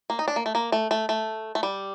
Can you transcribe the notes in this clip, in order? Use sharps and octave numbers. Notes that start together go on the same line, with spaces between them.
A#3
D#4
D4
A#3
A3
A#3
A3
A3
A3
A3
G3